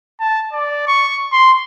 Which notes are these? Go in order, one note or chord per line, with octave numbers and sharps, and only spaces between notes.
A5
D5
C#6
C6